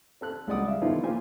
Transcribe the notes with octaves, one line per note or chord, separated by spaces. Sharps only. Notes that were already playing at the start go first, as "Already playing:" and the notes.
C4 A4 F#6
C#2 G3 G#3 D5 F#5 D#6
E5 F5
D3 D#3 F3 B3 E4 F4
A#3 F4 G4 C5 G#5